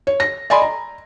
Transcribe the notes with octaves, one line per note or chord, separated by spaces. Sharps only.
C#5
A#6
D5 D#5 G#5 B5 C6
A#5